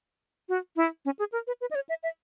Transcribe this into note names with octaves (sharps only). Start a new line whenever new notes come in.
F#4
E4
C#4
G#4
A#4
B4
B4
D#5
C#5
E5
E5